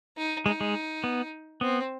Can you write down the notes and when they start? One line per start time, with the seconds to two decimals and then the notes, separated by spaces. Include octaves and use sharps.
0.17 D#4
0.46 G#3 D#4
0.61 G#3
1.04 B3
1.61 B3 C4